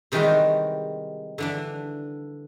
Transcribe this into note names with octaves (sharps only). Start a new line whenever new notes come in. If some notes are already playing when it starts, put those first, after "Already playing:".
C3 D#3 E3 G3 G#3 F#4
D3 E3 D4